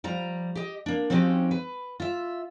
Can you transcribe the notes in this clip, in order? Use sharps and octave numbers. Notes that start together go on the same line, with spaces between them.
F3 G3 A#5
G4 D#5
A#3 D4
F3 C4 C#4 D#4 F#4 G4
B4
F4 E5